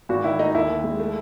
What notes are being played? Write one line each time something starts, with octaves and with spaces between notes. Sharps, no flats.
G#1 F#4
D#3 E4
A3 D#4
D#2 E4
D#2
G#3
A3